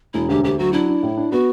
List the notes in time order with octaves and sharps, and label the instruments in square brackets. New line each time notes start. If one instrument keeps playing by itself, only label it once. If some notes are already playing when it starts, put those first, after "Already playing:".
[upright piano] E1 [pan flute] E4
[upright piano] D2 [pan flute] G4
[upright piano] D2 [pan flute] G4
[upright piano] F#3 [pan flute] F#4
[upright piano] D4 [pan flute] E4
[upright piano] D4
A2
D4
[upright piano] B3 [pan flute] F#4